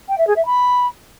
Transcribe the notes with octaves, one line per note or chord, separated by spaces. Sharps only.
G5
E5
G#4
E5
B5